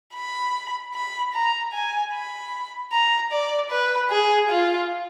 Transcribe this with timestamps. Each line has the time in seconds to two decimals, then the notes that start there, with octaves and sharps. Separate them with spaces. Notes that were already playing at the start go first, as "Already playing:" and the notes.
0.15 B5
0.94 B5
1.34 A#5
1.73 G#5
2.13 B5
2.92 A#5
3.31 D5
3.70 B4
4.11 G#4
4.50 F4